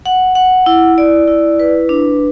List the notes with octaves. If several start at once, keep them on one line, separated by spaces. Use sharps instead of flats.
F#5
F#5
E4
D5
E4
B4
D4